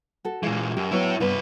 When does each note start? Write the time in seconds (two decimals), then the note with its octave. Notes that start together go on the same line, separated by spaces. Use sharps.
0.25 F#4 A4
0.43 A#2 E3 G#3 F5
0.77 F#2 G4
0.91 F#3 B3 E4 C#5
1.20 C2 G2 B3 D4 B4